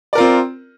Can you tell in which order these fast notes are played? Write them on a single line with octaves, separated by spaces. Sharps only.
D5 A#4 F4 C4